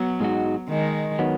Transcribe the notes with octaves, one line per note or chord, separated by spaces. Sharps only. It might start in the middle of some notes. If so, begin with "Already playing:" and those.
Already playing: F#3 B3
G#2 G#3 D#4 F#4
D#3 G#3
D#3 F#3 B3